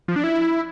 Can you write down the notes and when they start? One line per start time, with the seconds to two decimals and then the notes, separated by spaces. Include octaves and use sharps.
0.08 F3
0.16 D4
0.24 E4